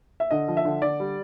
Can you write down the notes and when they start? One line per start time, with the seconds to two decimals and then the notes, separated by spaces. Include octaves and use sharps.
0.20 E5
0.31 D3 D#5
0.48 F3
0.57 E5
0.65 D3
0.82 D3 D5
1.00 G3